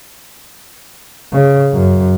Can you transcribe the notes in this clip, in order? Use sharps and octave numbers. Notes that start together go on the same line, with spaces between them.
C#3
F#2